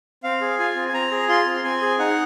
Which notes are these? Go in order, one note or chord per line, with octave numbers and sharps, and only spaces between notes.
C4 F5
G#4
F4 G#5
C4
G#5
C4 A#5
G#4
F4 C6
C4
C4 G#5
G#4
D#4 F#5